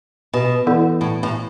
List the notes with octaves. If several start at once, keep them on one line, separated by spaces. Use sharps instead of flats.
B2
E3 B3 E4 A4 D5
A2
A2